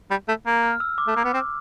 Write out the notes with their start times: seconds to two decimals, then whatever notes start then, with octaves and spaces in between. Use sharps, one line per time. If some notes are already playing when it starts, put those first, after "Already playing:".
0.10 G3
0.28 A3
0.46 A#3
0.63 F6
0.80 E6
0.98 D6
1.07 A3
1.16 A#3
1.24 B3
1.34 C4